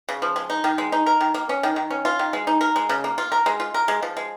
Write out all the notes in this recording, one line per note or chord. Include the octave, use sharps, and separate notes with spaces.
C#3
F3
G#3
D#4
D#3
G#3
D#4
A#4
D#3
A#3
C#4
D#3
D#3
C#4
F4
D#3
G#3
D#4
A#4
G#3
C#3
A#3
F4
A#4
G#3
F4
A#4
G#3
F3
G#3